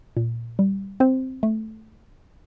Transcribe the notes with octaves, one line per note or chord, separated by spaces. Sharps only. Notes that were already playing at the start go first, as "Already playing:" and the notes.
A#2
G3
C4 C5
A3